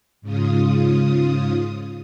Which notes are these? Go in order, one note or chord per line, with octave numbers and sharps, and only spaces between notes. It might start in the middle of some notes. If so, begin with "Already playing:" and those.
G#2 C#3 F4 D#6